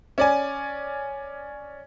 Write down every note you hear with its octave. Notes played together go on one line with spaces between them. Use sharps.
C#4 D5 G#5